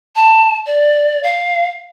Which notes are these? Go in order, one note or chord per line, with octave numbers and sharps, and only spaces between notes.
A5
D5
F5